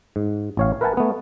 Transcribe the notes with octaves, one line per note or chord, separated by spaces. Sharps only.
G#2
A1 C#5 F5
A#4 B4 E5 F#5 G#5 A5
A3 B3